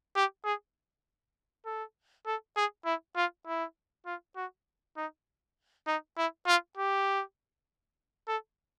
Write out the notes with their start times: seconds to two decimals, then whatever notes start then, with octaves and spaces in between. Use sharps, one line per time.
0.16 G4
0.45 G#4
1.65 A4
2.26 A4
2.56 G#4
2.85 E4
3.16 F4
3.47 E4
4.06 F4
4.36 F#4
4.97 D#4
5.87 D#4
6.17 E4
6.47 F4
6.77 G4
8.28 A4